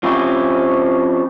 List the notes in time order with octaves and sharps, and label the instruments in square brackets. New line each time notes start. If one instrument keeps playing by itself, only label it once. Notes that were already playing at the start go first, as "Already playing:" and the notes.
[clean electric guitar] F3 C4 C#4 E4 F#4 G4